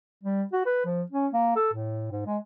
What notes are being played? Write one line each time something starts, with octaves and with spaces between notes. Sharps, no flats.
G3
F#4
B4
F3
C#4
A#3
A4
A2
G#2
G#3